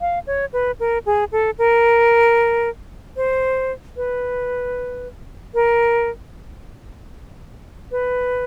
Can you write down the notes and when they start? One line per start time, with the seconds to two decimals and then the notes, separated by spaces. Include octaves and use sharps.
0.01 F5
0.27 C#5
0.53 B4
0.80 A#4
1.06 G#4
1.32 A4
1.59 A#4
3.16 C5
3.97 B4
5.54 A#4
7.91 B4